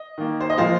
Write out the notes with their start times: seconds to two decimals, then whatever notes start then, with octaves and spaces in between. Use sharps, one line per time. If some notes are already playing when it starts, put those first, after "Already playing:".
Already playing: D#5
0.18 D#3 A#3
0.41 C5
0.50 D#5
0.57 A#2 F3 G#3 C5 F5